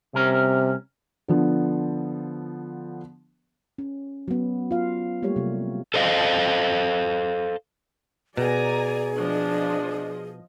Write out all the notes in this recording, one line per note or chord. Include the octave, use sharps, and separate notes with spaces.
C2 C3 C#4 A#4
D3 F3 B3
C#4
F#3 B3
F4 F5
G3 A3 A#3 G4 C#5
C3 F#3
A4 C5 D#5 F5
B2 G#4 D5 G#5 A#5
F3 D4 D#5